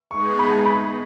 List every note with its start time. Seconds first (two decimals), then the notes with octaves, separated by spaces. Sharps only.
0.10 G#3 B3 D#4 G#4 C#6
0.39 B5
0.51 A5
0.66 B5